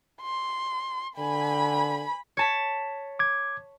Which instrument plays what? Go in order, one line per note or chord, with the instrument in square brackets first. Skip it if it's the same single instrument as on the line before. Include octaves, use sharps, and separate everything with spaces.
[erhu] C6
[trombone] D3 [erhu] G#5 [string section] B5
[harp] C#5 A5 B6
[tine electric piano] D6 G#6